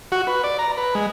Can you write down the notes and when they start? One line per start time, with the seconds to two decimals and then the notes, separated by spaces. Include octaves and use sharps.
0.12 F#4
0.27 B4
0.44 D5
0.59 A#5
0.77 B4
0.95 G#3